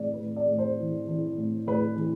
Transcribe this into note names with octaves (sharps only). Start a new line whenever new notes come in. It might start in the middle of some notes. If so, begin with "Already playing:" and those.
Already playing: A2 E3 D5
B4
A2
D5
A2
C5
E3
E3
A2
A2 B4
E3